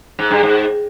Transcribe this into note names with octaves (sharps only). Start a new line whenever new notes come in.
G#2
G2
G#2